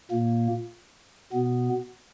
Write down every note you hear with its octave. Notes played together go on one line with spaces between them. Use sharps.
A#2 A#3
B2 B3